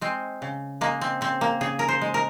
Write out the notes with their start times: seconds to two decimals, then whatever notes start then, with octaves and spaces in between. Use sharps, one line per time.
0.01 G#3 C4
0.42 C#3
0.81 G#3 A#3
1.01 C4
1.21 C#3 C4
1.41 A#3
1.61 C#3 G#4
1.79 A#4
1.88 C5
2.01 G#3
2.14 A#4